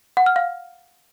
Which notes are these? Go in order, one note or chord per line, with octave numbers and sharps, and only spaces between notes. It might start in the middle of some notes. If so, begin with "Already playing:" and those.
F#5
F6
F5